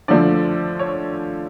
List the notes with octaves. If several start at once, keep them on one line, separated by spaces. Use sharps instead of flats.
D3 F3 A3 D5
C#5